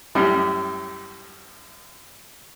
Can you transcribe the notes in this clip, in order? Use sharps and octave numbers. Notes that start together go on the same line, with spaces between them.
F#2 A2 G3